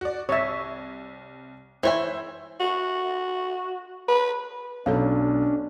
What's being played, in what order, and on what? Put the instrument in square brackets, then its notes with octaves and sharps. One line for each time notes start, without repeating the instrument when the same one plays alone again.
[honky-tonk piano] F#4 D5
[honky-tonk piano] C2 [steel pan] C#5 E5
[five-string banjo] E3 C#5 G#5 [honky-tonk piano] C5 E5
[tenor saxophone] F#4
B4
[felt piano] B1 [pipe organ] C#4 D4 [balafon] A4 C#5 F5